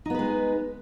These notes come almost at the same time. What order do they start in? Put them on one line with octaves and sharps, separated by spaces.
D#4 B3 B4 G#3